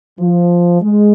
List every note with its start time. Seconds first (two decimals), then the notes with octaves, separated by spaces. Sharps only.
0.20 F3
0.82 G#3